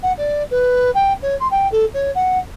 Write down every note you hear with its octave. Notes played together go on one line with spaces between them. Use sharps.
F#5
D5
B4
G5
C#5
C6
G5
A4
C#5
F#5